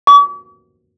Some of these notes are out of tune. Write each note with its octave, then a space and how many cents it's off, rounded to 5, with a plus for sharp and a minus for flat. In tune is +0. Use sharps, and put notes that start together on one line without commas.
D6 -45